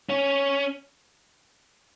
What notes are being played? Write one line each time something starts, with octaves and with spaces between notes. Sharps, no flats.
C#4